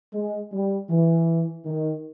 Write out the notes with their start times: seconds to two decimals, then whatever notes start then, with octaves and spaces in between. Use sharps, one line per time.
0.13 G#3
0.52 G3
0.89 E3
1.65 D#3